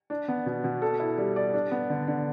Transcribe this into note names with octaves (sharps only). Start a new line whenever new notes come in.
D4
B3
B2
B2
A4
E4
G3
D5
D4
B3
D3
D3